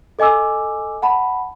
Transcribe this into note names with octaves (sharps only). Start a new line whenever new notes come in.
A4 D#5 G#5 D6 E6
F#5 A5 B5